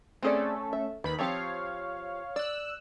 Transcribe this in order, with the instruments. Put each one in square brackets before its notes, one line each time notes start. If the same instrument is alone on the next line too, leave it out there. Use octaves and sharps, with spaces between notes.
[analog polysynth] A3 C#4 A4 [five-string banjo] C4 G#4 D5
[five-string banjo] E5
[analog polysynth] D#2 D#3 B5 [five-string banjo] B4
[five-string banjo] F3 C4 G4 [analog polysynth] C#5 F5
[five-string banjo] D5 [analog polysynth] E6 F#6